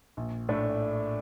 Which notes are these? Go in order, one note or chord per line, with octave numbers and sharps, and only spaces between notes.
A#1
A2 A3 D4